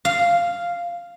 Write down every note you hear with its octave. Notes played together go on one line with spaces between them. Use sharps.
F5